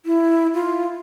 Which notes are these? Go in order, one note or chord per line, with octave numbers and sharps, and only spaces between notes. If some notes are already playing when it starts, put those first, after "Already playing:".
E4
F4